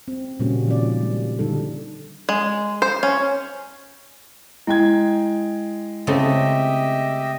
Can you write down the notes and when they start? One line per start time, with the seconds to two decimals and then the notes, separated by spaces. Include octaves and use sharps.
0.08 C4
0.39 A#2 C#3 G3 A#3 C#4 F#4
0.67 D#3 F3 G#3 C4 F4 D5
1.01 G3
1.39 D3 G3 D#4 A4
2.29 G#3
2.82 C5
3.03 C#4
4.67 G#3 E4 G5 G#6
6.07 C#3 A3 C4 G4 D#5 E5